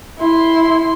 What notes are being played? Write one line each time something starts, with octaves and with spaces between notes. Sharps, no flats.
E4 C6